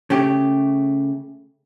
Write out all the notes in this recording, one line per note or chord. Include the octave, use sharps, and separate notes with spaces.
C#3 A3 G4